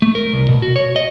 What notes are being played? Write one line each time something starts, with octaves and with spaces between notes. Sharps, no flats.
A3
A#4
C2
B2
F#4
C#5
D#5